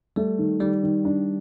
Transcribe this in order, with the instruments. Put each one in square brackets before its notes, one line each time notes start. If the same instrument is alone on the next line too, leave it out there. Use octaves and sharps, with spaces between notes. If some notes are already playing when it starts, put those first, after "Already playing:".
[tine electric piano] G3 [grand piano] A3
[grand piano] D#3
[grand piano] D#3 [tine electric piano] G3
[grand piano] D#3
D4